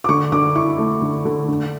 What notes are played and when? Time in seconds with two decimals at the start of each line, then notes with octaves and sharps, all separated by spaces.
0.04 D6
0.09 D3 C#6
0.32 D3 D6
0.55 E4 C#6
0.78 A3
1.02 D3
1.25 D3
1.48 D3